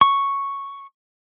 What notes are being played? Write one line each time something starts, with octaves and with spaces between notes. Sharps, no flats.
C#6